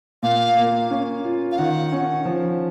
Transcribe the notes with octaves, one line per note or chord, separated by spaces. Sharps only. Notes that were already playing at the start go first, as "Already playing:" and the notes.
A#2 F5
A#3
C#4
F4
F5
D#3 F#5
C#4
F3